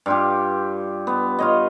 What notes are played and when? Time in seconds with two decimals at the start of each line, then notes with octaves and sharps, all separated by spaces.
0.06 G2 F4 G4
1.07 B3
1.39 F4 C#5 D#5